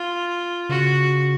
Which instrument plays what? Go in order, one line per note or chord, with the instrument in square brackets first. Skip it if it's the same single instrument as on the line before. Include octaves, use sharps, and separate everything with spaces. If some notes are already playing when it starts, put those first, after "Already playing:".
Already playing: [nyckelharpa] F4
[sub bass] C#3 [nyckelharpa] F#4